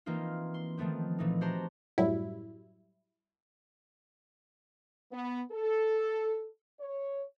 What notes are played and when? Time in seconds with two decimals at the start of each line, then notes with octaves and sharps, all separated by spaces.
0.06 E3 A#3 C4 D#4 F4
0.54 C6
0.78 D#3 F3 A3 B3 C4
1.18 A#2 E3 A3 D#4
1.41 F#4 G4 C5 A5 A#5 C6
1.98 F#2 A2 F#3 G3 E4
5.12 B3
5.52 A4
6.80 C#5